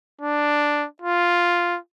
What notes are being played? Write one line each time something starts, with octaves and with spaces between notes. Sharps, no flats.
D4
F4